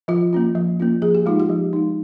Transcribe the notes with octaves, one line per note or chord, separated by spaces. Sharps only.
F3 F4
A#3 C#4 F4
F3
A#3 C#4 F4
F3 G#4
G4
G#3 D#4 F4
G4
F3
G#3 D#4